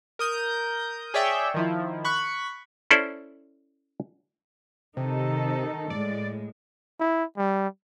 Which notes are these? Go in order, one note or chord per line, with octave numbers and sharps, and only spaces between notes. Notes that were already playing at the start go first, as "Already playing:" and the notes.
A#4 D#6 G6
G#4 C#5 D5 E5 G5
D#3 F3 E4
B5 C#6 F#6
C#4 E4 A4 C5 D5
C3 D#3 D#4 A4
A2 G#3 D5
E4
G3